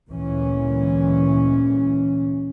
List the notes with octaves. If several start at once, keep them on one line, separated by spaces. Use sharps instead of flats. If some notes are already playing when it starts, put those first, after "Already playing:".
D2 A#2 E3 G#3 C#4